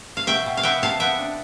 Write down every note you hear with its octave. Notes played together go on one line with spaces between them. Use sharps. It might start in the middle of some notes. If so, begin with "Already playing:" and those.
F5
B2 E5 G5
B2
F5
B3 E5 G5
C3 F5 A5
B3 E5 G5
D4